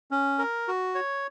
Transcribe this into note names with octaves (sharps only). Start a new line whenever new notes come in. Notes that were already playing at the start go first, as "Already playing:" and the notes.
C#4
A#4
F#4
C#5